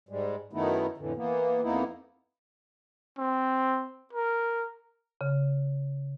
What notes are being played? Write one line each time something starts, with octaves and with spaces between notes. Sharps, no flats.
G#2 G3 G#3
F#2 D#3 A3 B3 D#4 E4
F2 A2 D3 E3
E3 A#3 B3
F2 A#3 B3 D#4 E4
C4
A#4
C#3